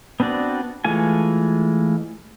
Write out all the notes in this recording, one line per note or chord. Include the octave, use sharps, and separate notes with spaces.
B3 C4 D4 F#4 D5
E3 G#3 A3 F4 G#5